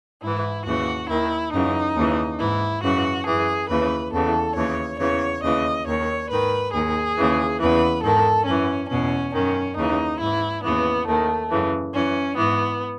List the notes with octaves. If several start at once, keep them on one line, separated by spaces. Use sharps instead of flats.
G#2 E3 E4
D#2 C#3 E3 F#4
D#2 D#3 E4
F#2 C#3 E3 D#4
D#2 C#3 E3
G#2 E3 E4
F#2 C#3 E3 F#4
F#2 E3 G#4
D#2 C#3 E3 B4
E2 C#3 E3 A4
D#2 C#3 E3 C#5
E2 C#3 E3 C#5
D#2 C#3 E3 D#5
D#2 D#3 C#5
G#2 D#3 B4
D#2 D#3 G#4
D#2 C#3 E3
E2 C#3 E3 B4
G#2 D#3 A4
F#2 E3 C#4
E2 B2 C#4
F#2 D#3 C#4
D#2 C#3 E3 D#4
G#2 E3 E4
D#2 C#3 E3 B3
D#2 D#3 A3
F#2 C#3 E3
F#2 E3 C#4
G#2 E3 B3